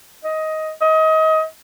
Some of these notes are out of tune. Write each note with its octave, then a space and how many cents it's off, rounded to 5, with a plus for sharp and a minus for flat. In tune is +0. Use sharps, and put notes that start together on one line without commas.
D#5 +15
D#5 +30